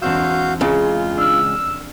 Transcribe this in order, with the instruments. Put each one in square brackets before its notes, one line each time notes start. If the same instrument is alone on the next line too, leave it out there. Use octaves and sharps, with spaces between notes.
[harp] E1 C4 E6 [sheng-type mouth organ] F#4 F5 G6
[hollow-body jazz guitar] C#2 C#3 [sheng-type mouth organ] F4
[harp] D4 F6 [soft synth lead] E6